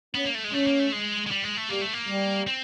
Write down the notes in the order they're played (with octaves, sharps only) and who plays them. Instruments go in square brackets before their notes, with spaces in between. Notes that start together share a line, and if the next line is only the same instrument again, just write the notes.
[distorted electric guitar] B3 [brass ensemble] C#4
[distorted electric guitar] A#3
A3
G#3
[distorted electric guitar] A3 [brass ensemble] C#4
[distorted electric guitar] A#3
A3
G#3
G#3
G3
G#3
A3
[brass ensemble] G3 [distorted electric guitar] A#3
[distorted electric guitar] A3
A#3
[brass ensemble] G3
[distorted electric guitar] C4